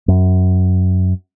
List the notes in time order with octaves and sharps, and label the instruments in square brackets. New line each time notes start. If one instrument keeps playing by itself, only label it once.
[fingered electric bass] F#2